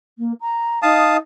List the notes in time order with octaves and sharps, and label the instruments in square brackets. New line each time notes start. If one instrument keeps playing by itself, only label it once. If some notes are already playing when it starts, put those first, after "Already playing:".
[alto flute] A#3
A#5
[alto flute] D#4 [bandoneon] F5 A5 D#6